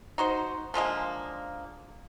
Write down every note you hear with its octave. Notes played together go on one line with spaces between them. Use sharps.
D#4 F#4 C5
D3 F3 G#3 A#3